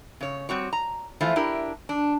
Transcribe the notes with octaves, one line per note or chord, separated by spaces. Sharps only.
C#3 C#5
G3 C4 F#4 C#5
A#5
E3 F3 A3 F4 C5
D4 E4 G4 A#4
D4